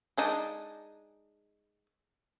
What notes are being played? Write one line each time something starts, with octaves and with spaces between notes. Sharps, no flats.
G#3 D4 D#4